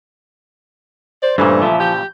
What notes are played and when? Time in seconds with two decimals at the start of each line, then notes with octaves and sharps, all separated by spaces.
1.22 C5 D5
1.38 G2 A#2 C#3 E3 A3
1.62 F3 E5
1.80 G4 G6